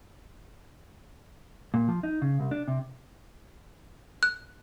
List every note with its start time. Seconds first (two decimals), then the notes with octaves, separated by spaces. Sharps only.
1.74 A#2
1.88 F3
2.03 D#4
2.22 C#3
2.40 C2
2.51 D4
2.68 C3
4.23 F#6